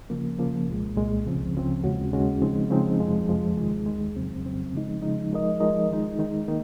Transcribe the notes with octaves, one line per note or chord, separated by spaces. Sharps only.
C#3 F3 A#3
C#3 F3 A#3
C2 A#2 G#3
C2 A#2 G#3
C#2 C#3 F3 C4
C#2 C#3 F3 C4
D#2 C#3 G#3 C#4 F#4
D#2 C#3 G#3 C#4 F#4
C#3 F3 G#3 C4 D#4
C#3 F3 G#3 C4 D#4
F2 C3 F3 G#3
F2 C3 F3 G#3
D#2 D#3 G#3
D#2 D#3 G#3
F2 C#3 F#3 C4
F2 C#3 F#3 C4
C#3 F3 G#3 D#4
C#3 F3 G#3 D#4
F3 G#3 D#4 A#4 D#5
F3 G#3 D#4 A#4 D#5
D#3 G#3 D#4
D#3 G#3 D#4
D#3 A#3 D#4